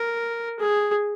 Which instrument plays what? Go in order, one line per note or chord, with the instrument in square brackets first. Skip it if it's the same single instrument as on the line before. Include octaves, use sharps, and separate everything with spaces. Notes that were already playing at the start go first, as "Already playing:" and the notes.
Already playing: [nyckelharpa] A#4
G#4